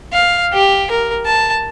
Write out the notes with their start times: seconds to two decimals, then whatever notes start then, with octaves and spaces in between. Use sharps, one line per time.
0.13 F5
0.53 G4
0.91 A#4
1.26 A5